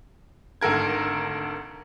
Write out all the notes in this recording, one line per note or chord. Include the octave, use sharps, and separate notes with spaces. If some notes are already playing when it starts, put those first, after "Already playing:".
G#1 D2 A4 A#4 G#6